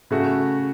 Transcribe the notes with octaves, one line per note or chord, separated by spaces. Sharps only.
C#3 A3 F#4